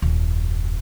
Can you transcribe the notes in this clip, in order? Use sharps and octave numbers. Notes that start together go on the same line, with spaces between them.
D#1 F#2